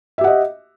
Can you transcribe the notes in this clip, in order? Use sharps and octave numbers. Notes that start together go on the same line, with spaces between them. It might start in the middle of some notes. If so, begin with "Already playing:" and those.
G4 D#5 E5 F#5